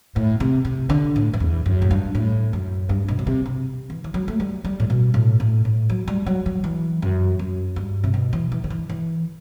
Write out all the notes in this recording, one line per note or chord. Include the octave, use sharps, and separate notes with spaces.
A2
C3
C3
D3
A2
F#2
E2
F#2
A2
G2
A2
F#2
G2
B2
B2
C3
C3
E3
E3
F#3
A3
G3
G3
A2
B2
A2
A2
A2
F#3
G3
F#3
F#3
E3
F#2
F#2
G2
C3
B2
E3
E3
D3
E3
E3